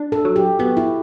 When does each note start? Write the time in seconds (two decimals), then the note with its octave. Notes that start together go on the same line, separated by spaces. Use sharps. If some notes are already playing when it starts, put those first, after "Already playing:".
Already playing: D4
0.12 A4
0.25 F#3
0.36 G4
0.59 B3 F#4
0.77 E4